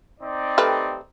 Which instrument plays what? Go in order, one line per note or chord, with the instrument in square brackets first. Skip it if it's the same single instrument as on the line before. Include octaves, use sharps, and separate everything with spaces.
[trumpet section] C4 D#4 D5
[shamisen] G3 A3 B4